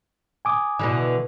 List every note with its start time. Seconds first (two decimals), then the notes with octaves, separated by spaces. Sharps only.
0.45 G#5 D6 D#6
0.79 B2 D3 E3